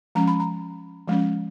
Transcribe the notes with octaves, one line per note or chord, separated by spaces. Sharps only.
F3 G#3 C#4 A#5
B5
A#5
F3 G#3 C#4